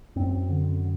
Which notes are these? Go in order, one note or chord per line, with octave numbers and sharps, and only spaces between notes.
F#2 C4
D3